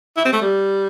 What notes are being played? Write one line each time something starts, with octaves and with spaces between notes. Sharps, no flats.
E4
C4
A3
G3